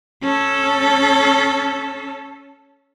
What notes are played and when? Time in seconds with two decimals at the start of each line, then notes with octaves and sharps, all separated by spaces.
0.23 C#4 A4